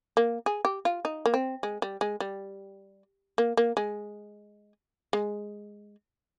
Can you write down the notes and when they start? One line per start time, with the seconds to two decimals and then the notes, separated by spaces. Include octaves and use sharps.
0.17 A#3
0.46 G#4
0.65 G4
0.85 F4
1.05 D#4
1.26 A#3
1.34 C4
1.63 G#3
1.82 G3
2.01 G#3
2.20 G3
3.38 A#3
3.57 A#3
3.77 G#3
5.13 G#3